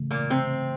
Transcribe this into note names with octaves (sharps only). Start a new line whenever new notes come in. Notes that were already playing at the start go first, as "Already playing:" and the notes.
Already playing: C#3 E3 A3
A#2 A#3
C3 C4